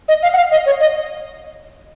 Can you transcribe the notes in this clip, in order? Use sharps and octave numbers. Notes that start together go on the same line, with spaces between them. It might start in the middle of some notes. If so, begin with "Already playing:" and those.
D#5
F5
F#5
F5
D#5
C#5
D#5